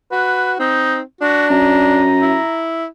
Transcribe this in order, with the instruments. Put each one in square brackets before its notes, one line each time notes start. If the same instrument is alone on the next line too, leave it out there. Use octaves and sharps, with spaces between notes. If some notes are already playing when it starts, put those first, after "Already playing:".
[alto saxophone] F#4 [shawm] B4
[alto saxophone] C4 [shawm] D#4
[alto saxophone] D4 [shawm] F#4
[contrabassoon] F#2 [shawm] A#5
[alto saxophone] E4